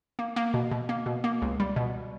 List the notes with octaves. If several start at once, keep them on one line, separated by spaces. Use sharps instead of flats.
A#3
A#3
B2
B2
A#3
B2
A#3
C#2
G3
B2